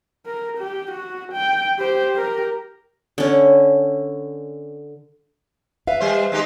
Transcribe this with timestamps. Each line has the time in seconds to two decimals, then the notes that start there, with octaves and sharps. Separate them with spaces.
0.26 A#4
0.58 G4
0.92 F#4
1.33 G5
1.78 G4 C5
2.14 G4 A#4
3.18 D3 C#4
5.87 B4 E5 F5
6.00 G3 C5
6.32 G#3 D#4 G4